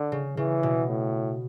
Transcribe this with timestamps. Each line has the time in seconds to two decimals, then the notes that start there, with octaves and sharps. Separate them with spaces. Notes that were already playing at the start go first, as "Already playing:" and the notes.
Already playing: D3
0.12 C#3
0.37 C#3 E3
0.63 B2
0.89 A2